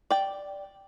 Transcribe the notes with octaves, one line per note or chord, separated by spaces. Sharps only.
D5 G5